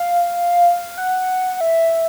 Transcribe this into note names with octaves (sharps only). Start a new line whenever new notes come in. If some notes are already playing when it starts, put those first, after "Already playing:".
Already playing: F5
F#5
E5